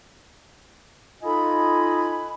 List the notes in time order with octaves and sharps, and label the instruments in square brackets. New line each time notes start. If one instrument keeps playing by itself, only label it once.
[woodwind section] D#4 F4 A4 D#5 G#5 B5